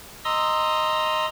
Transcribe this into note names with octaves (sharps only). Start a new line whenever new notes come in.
D#5 A#5 C6 D#6 E6